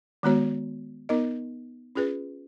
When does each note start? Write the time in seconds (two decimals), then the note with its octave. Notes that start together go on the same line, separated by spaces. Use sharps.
0.23 D#3 G#3 B3 F#4 C#5
1.09 B3 D#4 A#4 D#5
1.95 C#4 F4 G#4 B4